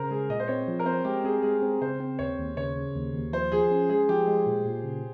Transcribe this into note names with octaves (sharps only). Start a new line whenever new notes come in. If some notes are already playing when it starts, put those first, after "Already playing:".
Already playing: C#3 A#4 C5
G#3 G#4
A#2 D#5
C5
C4 C#5
F3
A#4
C4 C5
G#3 G4
C4 G#4
G#3 G#4
C4
C#3 C5
C4
D#2 C#5
D#2
C#3 C#5
C#3
D#2
D#2
F3 C5
F3 G#4
C#4
G#3 G#4
F3 G4
G#3
A#2
A#2
C#3